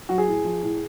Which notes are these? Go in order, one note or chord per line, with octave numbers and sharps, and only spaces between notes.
F#3 F#4
G#4
A2
F3
A2